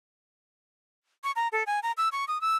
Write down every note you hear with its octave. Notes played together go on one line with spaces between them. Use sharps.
C#6
A#5
A4
G#5
A#5
E6
C#6
D#6
E6